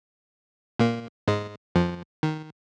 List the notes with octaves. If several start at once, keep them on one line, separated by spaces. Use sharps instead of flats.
A#2 A#3
G#2 G#3
F2 F3
D#3